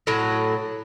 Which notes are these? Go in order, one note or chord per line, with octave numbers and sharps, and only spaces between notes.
A2 F#3